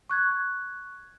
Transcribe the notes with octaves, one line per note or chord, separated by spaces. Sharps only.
C#6 F#6 G#6